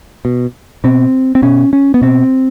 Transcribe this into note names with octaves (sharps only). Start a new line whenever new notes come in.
B2
B2 C4
C4
B2 C#4
C#4
B3
B2 C4